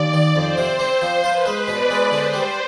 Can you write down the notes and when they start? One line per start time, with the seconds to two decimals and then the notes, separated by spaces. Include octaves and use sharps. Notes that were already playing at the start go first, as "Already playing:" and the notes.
Already playing: D#2 D5
0.13 D#3
0.35 F2 C5
0.57 C3
0.79 C4
1.02 F3
1.24 F4 B4
1.46 G#3
1.68 B2 D5
1.90 G#3
2.11 D3 C5
2.34 G3